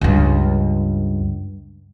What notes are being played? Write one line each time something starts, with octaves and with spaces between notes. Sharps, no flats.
C#2 G2